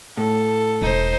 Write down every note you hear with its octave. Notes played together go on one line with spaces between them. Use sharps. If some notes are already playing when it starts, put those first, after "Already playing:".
A2 A4
E1 D#4 C5